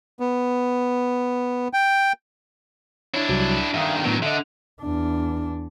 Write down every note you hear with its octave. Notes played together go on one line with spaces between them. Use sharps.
B3
G5
D4 E4 C#5
C2 F#3
G2 D#3 E5 F5 D#6
A2 D#3 F#3 B3 D4
D3 D#5 E5
E2 D4